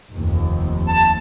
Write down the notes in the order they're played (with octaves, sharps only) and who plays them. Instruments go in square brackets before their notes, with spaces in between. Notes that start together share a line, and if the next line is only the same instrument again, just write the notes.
[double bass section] F1 D#2 C3
[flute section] A5